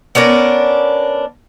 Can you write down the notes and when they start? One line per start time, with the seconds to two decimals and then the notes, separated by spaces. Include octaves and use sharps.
0.15 B3 C#4 D4 A#4